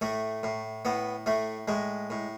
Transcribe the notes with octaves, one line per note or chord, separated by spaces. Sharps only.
A2 A3
A2
A2 B3
A2 A3
A2 G#3
A2